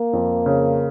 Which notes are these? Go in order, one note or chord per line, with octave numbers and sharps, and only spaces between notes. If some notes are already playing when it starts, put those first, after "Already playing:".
Already playing: A#3
F2
C#3